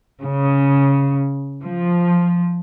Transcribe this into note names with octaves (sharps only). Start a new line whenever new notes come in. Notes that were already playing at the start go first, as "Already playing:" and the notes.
C#3
F3